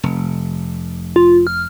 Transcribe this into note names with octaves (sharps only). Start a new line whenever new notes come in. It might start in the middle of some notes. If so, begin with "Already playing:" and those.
F1
F4
F6